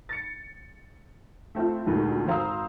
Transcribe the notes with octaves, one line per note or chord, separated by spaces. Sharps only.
A6 C#7
A3 C4 E4 F4
D2 A#2 D3 D#3 G3 G#3
G#1 C5 F5 A#5 D#6 E6